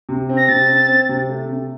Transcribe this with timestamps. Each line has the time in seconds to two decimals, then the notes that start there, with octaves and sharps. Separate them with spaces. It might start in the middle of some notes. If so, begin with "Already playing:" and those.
0.09 C3
0.29 C4
0.37 A#6
0.48 C3 A6
0.68 C4
0.88 C4
1.09 C3
1.29 A3
1.49 C3